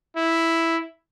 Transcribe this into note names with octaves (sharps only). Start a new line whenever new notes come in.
E4